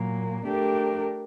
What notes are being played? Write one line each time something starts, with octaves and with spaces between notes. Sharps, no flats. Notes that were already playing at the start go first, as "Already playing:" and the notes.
Already playing: A#2 F#3 A#3
A3 D4 G4 A#4